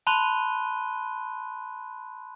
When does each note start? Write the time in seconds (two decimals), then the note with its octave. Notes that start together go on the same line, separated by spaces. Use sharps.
0.07 A5 B5 C6 F#6 D#7 G7